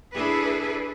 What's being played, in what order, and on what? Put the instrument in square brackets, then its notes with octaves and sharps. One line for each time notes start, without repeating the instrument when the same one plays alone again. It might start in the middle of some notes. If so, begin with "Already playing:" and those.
[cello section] D4 E4 G#4 A4 B4